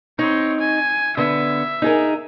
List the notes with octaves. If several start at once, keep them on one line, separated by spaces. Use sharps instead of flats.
C4 D#4 C#5
G#5
D3 B3 E5
D#4 G#4 A#4